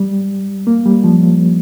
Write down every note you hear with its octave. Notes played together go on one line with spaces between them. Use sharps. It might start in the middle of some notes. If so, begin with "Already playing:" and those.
Already playing: G3
A#3
G3
F3